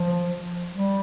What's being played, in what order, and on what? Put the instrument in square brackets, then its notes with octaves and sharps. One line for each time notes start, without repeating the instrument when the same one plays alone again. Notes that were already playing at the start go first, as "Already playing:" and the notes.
Already playing: [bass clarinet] F3
G3